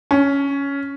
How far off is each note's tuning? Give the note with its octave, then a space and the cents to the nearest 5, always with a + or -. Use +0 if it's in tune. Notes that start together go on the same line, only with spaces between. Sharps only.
C#4 +10